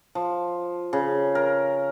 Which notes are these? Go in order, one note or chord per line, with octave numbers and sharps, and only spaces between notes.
F3
C#3
A#4